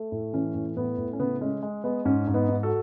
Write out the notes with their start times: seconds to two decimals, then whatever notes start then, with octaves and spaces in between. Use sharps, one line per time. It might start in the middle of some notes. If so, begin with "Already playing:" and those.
Already playing: A3
0.12 A2
0.34 E3 C#4
0.55 A2
0.77 A2 B3
0.98 A2
1.13 C#4
1.19 C#3 B3
1.41 G#3 C#4
1.62 G#3
1.84 G#3 B3
2.05 G#2 C#4
2.27 G#2
2.34 B3 D#4
2.49 G#2
2.63 F#4 A4